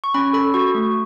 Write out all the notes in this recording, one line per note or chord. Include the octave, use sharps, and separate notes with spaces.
C#6
C#4 B5
A4 B5
F#4 C#6
A3